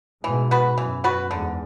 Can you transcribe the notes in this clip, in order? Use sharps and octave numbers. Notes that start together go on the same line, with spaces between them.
G#2 B2 E3
B3 F#4 B4
F#2 E3
B3 F#4 B4
E2 G#2 D3